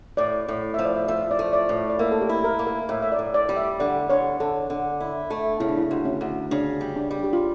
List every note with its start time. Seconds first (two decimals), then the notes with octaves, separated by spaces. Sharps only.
0.17 A2 D5
0.48 A2
0.74 F3 E5
0.85 D5
0.96 E5
1.08 F3 E5
1.23 E5
1.31 D5
1.39 A3
1.53 D5
1.69 A2
1.76 E5
1.90 D5
1.99 A#3 E5
2.11 A4
2.21 G4
2.29 E4
2.44 A#4
2.59 A#3
2.67 A#4
2.89 A2 E5
3.02 E5
3.12 D5
3.19 A2
3.34 D5
3.49 G3
3.57 E5
3.80 D3 D5
4.09 D3 C#5
4.40 D3 A4
4.70 D3
5.00 E4
5.30 A3
5.60 C#3 E4
5.69 D4
5.77 E4
5.91 D2
6.05 C#4
6.21 D2
6.51 C#3 D4
6.81 G3
6.96 D4
7.11 G3
7.24 G4
7.33 F4